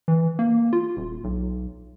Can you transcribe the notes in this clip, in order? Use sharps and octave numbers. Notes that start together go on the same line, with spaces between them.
E3
A#3
F4
D#1
B1